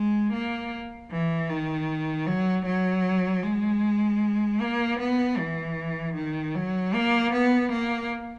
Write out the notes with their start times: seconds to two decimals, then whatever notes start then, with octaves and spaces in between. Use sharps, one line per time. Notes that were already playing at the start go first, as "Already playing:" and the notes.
Already playing: G#3
0.32 A#3
1.11 E3
1.49 D#3
2.27 F#3
2.65 F#3
3.43 G#3
4.61 A#3
4.99 B3
5.38 E3
6.15 D#3
6.55 F#3
6.94 A#3
7.33 B3
7.72 A#3